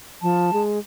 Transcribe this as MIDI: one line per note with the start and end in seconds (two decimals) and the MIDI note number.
0.22 0.51 53
0.22 0.62 81
0.53 0.79 56